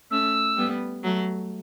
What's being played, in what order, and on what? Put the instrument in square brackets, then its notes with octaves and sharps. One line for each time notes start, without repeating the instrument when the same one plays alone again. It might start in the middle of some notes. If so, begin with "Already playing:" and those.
[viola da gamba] A3 C#4 [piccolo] E6
[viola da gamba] G3 B3
F#3 A3